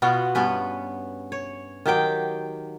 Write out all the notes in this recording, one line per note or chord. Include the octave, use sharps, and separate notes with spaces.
B2 B3 F4 F#4
G2 B3 C#4 B4
C#5
D#3 F#3 G4 G5